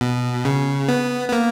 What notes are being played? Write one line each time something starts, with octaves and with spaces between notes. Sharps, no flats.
B2
C#3
B3
B3
A#3